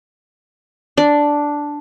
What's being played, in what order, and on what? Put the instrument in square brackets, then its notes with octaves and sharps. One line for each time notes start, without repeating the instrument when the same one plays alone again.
[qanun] D4